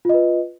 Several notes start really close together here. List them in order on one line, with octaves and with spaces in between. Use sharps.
F4 D#5 B4